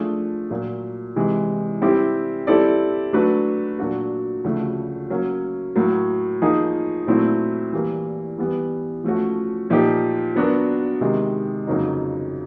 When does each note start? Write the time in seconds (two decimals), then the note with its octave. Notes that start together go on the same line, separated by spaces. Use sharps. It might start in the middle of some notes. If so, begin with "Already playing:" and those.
Already playing: F3 A3 D4 F4 G#4
0.50 A#2 F#3 A#3
1.16 C3 E3 G#3
1.82 G3 C4 E4 G4
2.47 G3 C4 E4 A4 D5
3.13 F#3 A3 D4 F#4 B4
3.79 A#2 F#3 A#3 D4 F#4
4.44 D2 C#3 F3 A3
5.10 F#3 A#3 C#4
5.76 A2 F#3 A#3
6.42 F3 A#3 D#4 G#4
7.07 A#2 F#3 A3 C4 E4
7.73 E3 G3 A#3
8.38 E3 G3 B3
9.04 F3 A3 C#4 F#4
9.70 A#2 F3 A#3 D#4 G4
10.35 F#3 B3 D4 F#4 A#4
11.01 C3 D#3 G#3
11.67 F2 C#3 F#3 A#3 D#4